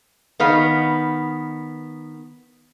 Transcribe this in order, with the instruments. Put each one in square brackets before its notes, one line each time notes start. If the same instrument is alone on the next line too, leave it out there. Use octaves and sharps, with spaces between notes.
[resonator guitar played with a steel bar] D#3 B3 F5